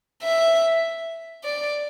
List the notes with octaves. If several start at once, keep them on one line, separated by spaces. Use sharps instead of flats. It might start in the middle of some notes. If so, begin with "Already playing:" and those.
E5
D5